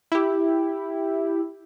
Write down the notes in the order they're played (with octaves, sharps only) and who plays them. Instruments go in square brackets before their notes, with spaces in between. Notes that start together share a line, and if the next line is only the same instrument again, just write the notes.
[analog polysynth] E4 G4